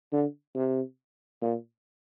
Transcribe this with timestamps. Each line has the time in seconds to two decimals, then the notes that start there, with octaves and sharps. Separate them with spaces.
0.13 D3
0.55 C3
1.42 A#2